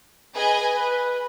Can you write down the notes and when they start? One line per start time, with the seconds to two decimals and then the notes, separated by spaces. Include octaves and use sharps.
0.34 G#4 B4 D#5 G#5
0.76 B4